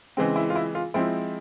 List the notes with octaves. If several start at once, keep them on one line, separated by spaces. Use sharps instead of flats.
C#3 E3 G#3 C4
E4
F4
E4
F4
F3 G#3 C4 E4